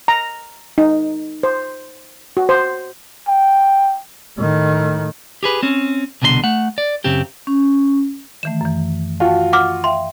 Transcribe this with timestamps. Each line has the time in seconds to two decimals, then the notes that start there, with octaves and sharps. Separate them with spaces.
0.08 A#5
0.78 D#4
1.43 C5
2.37 F#4
2.49 C5
3.28 G5
4.37 A2 D#3
5.43 G4 G#4 B4
5.63 C4 C#4
6.22 C2 B2 D3 A4 C6
6.44 A3 F#5
6.78 D5
7.04 F#2 C#3 C4 G4
7.47 C#4
8.43 D#3 E3 A3 E7
8.61 F#2 E3
9.20 F4 F#4 F5 G5 A5
9.53 F#5 D6 F6
9.84 E5 F5 G5 C6